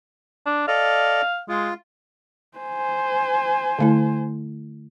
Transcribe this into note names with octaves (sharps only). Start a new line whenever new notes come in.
D4
A4 D5 D#5 F5
G#3 F4
C5 G#5
D3 A3 E4